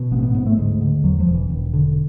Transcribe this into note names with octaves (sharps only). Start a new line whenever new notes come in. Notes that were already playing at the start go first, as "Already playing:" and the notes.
Already playing: B2
A1 B3
C4
B3
G#2 B3
A3
D2 G#3
D3
E2 F#3
F3
E1
E3
E1 D#3
D3